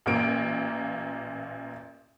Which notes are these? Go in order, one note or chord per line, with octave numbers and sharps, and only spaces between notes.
A1 A#2 A#3 D7